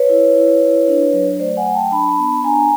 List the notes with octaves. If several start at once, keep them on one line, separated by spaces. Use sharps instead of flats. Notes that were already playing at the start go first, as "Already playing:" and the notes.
Already playing: B4 C#5
E4
E4
E4
D4
F#3
A3 C5 D5
F#5 G#5
F#3
G5 A5
D4 A5 B5
B3
D4 G#5 A#5